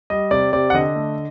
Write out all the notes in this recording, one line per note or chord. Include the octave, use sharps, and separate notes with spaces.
G3 D#5
C3 D5
C3 D5
F#5
D3 D#5
A3